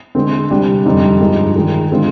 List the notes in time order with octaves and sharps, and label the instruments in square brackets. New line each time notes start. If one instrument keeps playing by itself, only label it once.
[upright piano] D3 G#3 C4
C3 G3 D4
F2 D3 G3 C4 D#4
G2 F3 G#3 D#4
D#3 G#3 D#4
D3 G#3 C4 F4